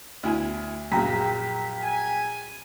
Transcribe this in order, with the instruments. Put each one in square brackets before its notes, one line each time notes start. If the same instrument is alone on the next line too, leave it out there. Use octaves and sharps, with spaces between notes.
[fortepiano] D2 E4 G#5
[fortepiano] A#1 F#2 [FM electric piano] G5 A#5 B6
[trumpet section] G#5